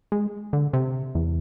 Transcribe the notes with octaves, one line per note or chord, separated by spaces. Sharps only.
G#3
D3
C3
E2